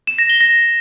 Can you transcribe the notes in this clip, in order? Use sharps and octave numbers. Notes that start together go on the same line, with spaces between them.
E7
A#6
G7
A#6